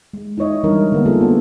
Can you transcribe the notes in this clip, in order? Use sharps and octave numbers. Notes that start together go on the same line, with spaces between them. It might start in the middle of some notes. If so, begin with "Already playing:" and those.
G#3
D#4 E4 C#5 D#5
E3 G3 G#3 D4 D#4 A#4
D3 A#3 B3
A3 A#3 D4 F4 G#4 A4
B3 C#4 A4